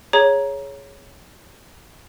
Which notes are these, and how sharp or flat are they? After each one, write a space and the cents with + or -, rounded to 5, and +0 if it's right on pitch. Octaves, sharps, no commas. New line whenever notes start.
G#4 +0 C#5 +0 A#5 +10